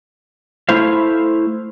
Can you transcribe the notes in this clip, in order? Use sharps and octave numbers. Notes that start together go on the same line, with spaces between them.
A3 E4 C5 F5